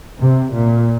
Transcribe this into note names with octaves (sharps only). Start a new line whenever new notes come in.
C3
A#2